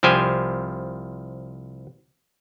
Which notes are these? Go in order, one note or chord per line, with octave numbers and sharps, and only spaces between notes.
C2 F3 G4 C5 G#5